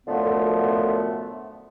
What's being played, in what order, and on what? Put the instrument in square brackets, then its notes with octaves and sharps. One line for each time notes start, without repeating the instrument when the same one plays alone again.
[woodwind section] F#2 A2 D3 F3 A3 B3